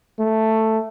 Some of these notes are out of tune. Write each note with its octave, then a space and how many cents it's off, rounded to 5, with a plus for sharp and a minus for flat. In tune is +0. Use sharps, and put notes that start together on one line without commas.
A3 +5